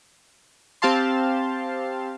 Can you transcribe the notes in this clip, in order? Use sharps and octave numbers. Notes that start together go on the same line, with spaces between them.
C4 G4 F5 A5 C6